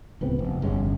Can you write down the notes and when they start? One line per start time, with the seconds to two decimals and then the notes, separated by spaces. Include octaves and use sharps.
0.21 D1 C#2 B3 C4
0.39 F1
0.62 G1 G#3 C#4